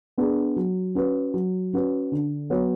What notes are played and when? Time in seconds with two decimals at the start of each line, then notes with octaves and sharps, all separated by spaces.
0.17 B3 D4 G#4
0.56 F#3
0.95 C#4 F#4 B4
1.34 F#3
1.73 C#4 F#4 B4
2.12 D3
2.50 F#3 B3 F#4 C#5